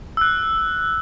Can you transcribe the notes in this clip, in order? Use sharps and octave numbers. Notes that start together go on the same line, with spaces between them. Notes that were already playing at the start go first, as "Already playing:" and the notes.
E6 F#6